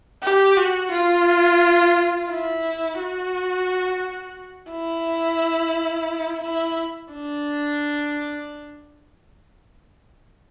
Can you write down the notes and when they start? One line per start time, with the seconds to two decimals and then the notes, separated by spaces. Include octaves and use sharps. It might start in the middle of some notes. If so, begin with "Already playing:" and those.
0.23 G4
0.57 F#4
0.92 F4
2.29 E4
2.98 F#4
4.70 E4
6.43 E4
7.12 D4